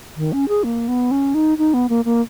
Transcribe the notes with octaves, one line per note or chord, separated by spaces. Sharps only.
D#3
C#4
G#4
A#3
B3
C#4
D#4
D#4
B3
A#3
A#3